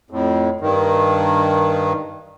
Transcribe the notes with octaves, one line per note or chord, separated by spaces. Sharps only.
F2 A2
G2 D#3